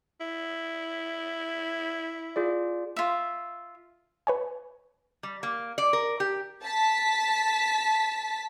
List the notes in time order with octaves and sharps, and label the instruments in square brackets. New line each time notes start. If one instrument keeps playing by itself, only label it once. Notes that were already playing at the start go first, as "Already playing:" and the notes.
[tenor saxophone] E4
[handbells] F4 G#4 D5
[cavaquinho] F4 E5
[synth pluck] B4 C#5 G#5
[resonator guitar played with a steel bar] G3
A#3
D5
A#4
G4
[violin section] A5 B6